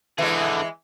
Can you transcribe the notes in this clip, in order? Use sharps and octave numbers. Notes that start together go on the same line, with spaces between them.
D3 E3 G#3 G#4